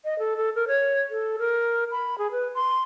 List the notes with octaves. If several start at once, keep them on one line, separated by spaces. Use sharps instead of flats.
D#5
A4
A4
A#4
C#5
A4
A#4
B5
G#4
B4
C6